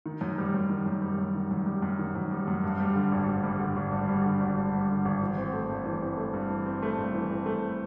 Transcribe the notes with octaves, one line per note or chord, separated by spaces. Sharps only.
D#3
F#2
G3
F#2
D#3
F#2
G3
F#2
D#3
F#2
G3
F#2
D#3
F#2
G3
F#2
G2
G3
D3
G#1
G2
G3
D3
G#1
G2
G3
D3
G#1
G2
G3
D3
G#1
E3
C4
A3
G2
E3
C4
A3
G2
E3
C4
A3
G2
E3
C4
A3